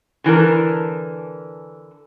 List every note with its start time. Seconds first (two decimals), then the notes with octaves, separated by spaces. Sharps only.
0.24 D3 E3 D4 A#4